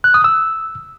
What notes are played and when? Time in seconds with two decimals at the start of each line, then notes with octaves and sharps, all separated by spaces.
0.04 F#6
0.14 D#6
0.24 E6